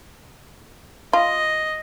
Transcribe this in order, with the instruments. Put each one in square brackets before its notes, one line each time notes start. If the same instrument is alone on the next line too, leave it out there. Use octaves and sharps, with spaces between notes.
[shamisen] F4 [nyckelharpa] D#5